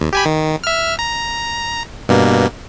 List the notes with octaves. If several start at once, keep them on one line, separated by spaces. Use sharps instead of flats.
D#2
G4 G#5 B5
D#3
E5 F6
A#5
G2 B2 A#3